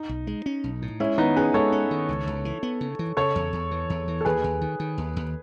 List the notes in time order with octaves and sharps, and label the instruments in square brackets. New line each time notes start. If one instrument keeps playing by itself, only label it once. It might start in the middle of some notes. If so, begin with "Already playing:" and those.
Already playing: [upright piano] D#4
[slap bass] B1
G#3
C#4
B1
A2
[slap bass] G#3 [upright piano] C#4 E4
[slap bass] D#3 [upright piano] B3 D#4
[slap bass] C#4 [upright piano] G#4 B4
[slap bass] G#3 [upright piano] A4 C#5
[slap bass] C#4
D#3
C#2
C#2
E3
B3
C#3
E3
[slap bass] C#3 [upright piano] A4 C#5
[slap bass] E2
E2
E3
E2
E3
[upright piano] A4
[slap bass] D#2 [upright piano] G#4 B4
[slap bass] D#2
D#3
D#3
D#2
D#2